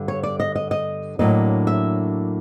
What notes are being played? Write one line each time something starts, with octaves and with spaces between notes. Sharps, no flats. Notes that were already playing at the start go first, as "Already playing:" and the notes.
Already playing: G2 D3 G3 B3
C#5
D5
D#5
D#5
D#5
A2 F#3 A#3 D4 D#5
E5